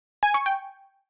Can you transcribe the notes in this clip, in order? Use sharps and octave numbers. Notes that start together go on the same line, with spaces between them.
G#5
C#6
G5